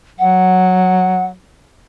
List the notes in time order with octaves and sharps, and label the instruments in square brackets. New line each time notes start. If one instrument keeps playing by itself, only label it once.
[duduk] F#3 [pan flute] F#5